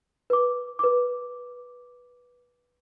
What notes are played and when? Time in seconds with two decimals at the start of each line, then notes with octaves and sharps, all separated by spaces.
0.30 B4 D6
0.79 B4 D6